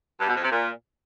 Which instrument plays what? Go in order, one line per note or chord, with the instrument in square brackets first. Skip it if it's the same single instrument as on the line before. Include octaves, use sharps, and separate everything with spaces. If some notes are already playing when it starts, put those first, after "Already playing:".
[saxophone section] G2
B2
F2
C3
A#2